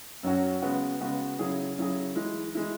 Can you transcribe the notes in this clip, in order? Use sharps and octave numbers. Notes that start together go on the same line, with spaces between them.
F#2 F#3 C#4 F#4
C#3 G#3 B3 F#4
C#3 G#3 B3 F#4
C#3 F#3 E4 G#4
C#3 F#3 E4 G#4
E3 G#3 E4
E3 G#3 E4